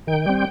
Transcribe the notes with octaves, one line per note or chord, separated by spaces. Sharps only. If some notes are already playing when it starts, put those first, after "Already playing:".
D#3 G5
G3 C4